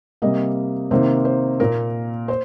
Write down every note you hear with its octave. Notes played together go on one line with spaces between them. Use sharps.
C3 G3 A#3 D#5
C3 D#3 A#3 C5
C5
A#2 A#3 A#4
C5